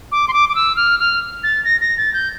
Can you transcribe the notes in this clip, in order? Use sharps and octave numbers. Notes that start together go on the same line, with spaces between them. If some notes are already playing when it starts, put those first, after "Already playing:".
D6
C6
D6
D6
E6
F6
F6
A6
A#6
A#6
A6
G6